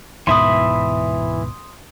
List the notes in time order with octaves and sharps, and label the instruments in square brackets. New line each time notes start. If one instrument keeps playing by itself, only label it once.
[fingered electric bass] D1 G#2 B2 [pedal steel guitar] E3 E5 B5 [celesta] C6 D#6